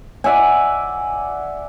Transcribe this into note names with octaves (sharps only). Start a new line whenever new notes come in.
D5 E5 F#5 G#5